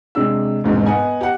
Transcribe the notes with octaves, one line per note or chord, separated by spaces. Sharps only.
C3 G#3 D4 E6
E1 A#1 G#2 B2 C4
B3 D#5 F#5 G#5
G4 F#5